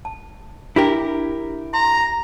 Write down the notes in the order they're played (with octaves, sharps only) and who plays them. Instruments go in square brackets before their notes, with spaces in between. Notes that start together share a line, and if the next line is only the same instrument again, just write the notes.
[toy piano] A5
[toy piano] D4 [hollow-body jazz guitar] E4 G4 A#4
[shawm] A#5 [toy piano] C6